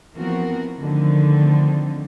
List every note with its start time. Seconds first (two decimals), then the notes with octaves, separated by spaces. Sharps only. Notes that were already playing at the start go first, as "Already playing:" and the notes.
0.15 E3 F3 B3 C4 F#4 A#4
0.79 D3 D#3 F3 A3 C4